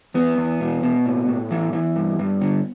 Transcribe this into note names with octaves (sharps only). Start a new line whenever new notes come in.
E2 B3
E2
B2
B2
A2
A2
E3
E3
G2
G2
D3